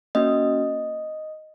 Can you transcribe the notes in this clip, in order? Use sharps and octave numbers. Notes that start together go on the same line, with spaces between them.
A#3 C#4 F#4 D#5